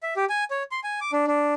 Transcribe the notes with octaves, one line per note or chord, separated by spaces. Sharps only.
E5
G4
G#5
C#5
C6
G#5
D6
D4
D4